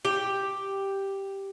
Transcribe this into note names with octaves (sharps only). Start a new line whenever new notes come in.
G4